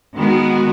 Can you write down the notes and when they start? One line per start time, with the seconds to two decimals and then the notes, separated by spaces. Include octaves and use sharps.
0.15 D#3 G#3 B3 F#4